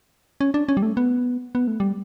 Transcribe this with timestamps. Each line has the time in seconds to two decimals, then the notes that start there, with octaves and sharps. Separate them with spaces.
0.41 C#4
0.54 D4
0.69 C#4
0.77 G3
0.83 A3
0.97 B3
1.55 B3
1.67 A3
1.80 G3